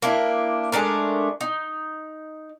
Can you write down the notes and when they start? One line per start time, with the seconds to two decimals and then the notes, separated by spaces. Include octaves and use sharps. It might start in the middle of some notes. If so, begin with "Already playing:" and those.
0.02 A#3 D4 E4
0.72 G#3 A3 D4 A#4
1.41 D#4